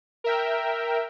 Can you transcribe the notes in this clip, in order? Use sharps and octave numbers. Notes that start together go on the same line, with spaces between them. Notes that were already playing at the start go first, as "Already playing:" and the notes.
A#4 E5 G5